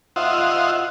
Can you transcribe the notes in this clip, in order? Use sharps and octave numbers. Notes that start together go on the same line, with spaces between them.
F4 C5 D#5 E5 F#5